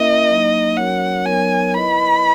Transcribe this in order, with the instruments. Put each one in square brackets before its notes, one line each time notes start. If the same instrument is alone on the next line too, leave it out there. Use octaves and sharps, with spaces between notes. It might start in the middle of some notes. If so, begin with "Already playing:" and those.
Already playing: [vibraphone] A#3 C#4 E4 A#4 E5 [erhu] D#5
[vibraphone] F#3 A#3 D#4
[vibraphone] F#3 C#4 F#4 A#4 C#5 [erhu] F#5
[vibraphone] F#3 B3 D#4 A#4 C#5 [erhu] G#5
[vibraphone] E4 B4 D#5 [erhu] B5